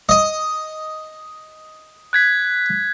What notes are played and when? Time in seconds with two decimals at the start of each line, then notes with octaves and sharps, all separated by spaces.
0.09 D#5
2.13 F#6 G#6 B6